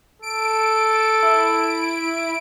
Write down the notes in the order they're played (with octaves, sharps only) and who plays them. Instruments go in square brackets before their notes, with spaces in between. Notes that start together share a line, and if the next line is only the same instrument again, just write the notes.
[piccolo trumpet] A4 [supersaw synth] D7
[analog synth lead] E4